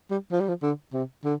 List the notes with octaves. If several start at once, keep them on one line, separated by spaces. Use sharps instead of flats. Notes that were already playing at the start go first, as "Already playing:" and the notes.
G3
F3
G3
F3
D3
C3
D3